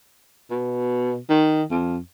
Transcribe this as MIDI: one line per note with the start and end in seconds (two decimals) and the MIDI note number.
0.50 1.17 47
1.30 1.63 51
1.71 1.98 41